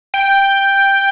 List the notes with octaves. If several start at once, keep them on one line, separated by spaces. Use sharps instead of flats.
G5